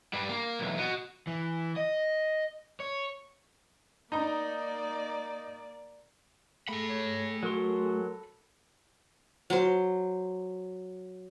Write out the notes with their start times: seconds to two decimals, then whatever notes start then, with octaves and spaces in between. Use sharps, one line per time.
0.13 G2 G3
0.29 A#3
0.59 B1 E2
0.79 F#4 D#5
1.27 E3
1.76 D#5
2.80 C#5
4.12 A#3 D#4 D5 A#5
6.68 A3 G#4 A4 B5
6.89 C#5
7.43 F#3 F#4 A#4 C6
9.50 F#3 C5